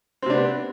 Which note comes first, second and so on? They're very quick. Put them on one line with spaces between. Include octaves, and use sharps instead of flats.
C4 C3 D4 B3